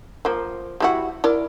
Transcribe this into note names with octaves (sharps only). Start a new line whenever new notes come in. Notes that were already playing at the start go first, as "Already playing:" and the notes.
F3 A#3
G3 E4 F#4
E4 A#4 D5